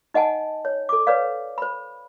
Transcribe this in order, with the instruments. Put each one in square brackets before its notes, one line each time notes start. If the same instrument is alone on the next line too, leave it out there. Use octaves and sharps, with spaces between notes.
[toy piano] D#4 D#5 F#5 G#5 A5
C#5
A4 D6
B4 C#5 D5 F5
C5 B5